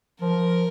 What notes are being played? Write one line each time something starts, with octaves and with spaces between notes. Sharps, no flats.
F3 A#4